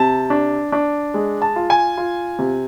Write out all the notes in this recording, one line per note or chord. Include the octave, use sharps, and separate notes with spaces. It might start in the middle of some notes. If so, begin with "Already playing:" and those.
Already playing: C3 A5
D4
D4
G#3
A5
F4
G#5
F4
C3